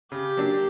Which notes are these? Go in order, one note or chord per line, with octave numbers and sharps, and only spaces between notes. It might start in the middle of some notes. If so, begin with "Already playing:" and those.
C#3 G4
F#3 A#3 D4